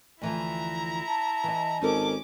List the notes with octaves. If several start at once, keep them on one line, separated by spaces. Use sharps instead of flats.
D2 E3 F3 E4 A#5
A5
E3 D#5
G#1 C#4 D#4 A4 A#4 D6